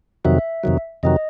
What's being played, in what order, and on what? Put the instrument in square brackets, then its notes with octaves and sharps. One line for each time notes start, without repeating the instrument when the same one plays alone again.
[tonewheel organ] F2 C3 D#3 F#3 [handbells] E5
[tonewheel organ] F2 C3 D#3 F#3
[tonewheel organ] F2 C3 D#3 F#3 [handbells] D#5